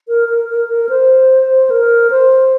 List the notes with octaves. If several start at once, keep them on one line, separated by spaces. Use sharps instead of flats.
A#4
A#4
A#4
A#4
C5
A#4
C5